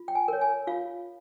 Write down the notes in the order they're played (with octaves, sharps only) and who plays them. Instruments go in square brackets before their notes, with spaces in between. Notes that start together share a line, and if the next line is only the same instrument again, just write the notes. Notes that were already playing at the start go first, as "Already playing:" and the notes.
Already playing: [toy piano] F4
G5
G#5
A#4 C#5
G#5
F4 F5